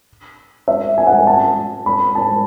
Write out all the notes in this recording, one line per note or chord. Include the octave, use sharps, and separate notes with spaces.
E5
G#5
F#5
G#5
A5
B5
A5